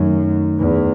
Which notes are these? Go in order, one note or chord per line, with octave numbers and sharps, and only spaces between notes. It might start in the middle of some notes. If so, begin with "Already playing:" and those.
Already playing: F#2 D#3 A3 D#4
E2